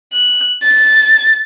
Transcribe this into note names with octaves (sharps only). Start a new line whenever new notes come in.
F#6
A6